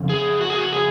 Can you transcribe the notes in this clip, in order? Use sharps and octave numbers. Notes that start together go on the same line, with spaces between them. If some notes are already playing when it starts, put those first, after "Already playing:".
Already playing: F2 C#3
G#4
F#4
G#4
F#4
G#4